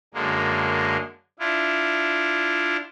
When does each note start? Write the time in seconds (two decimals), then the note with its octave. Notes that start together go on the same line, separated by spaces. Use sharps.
0.14 F#2 D3 G#3 A#3
1.39 D4 E4 F4